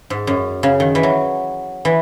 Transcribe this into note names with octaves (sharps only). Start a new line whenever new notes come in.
G#2
F#2
C#3
D#3
E3
F#3
E3